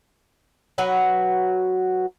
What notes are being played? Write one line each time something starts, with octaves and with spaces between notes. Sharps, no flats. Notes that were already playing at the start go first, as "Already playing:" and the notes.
F#3 F#4 B4 F#5